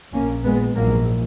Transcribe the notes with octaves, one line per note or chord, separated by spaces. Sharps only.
A#1 A#2 A#3 C#4
G#3 B3
A#1 G#2 F#3 A#3